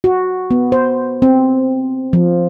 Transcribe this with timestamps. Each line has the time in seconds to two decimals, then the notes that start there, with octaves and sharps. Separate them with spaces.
0.04 F#4
0.51 B3
0.72 C5
1.22 C4
2.13 F3